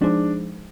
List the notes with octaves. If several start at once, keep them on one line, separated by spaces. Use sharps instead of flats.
F3 G#3 D4 D#4 G#4 C5